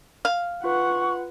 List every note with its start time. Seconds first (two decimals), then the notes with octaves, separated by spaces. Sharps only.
0.25 F5
0.64 F4 B4 F#5 C#6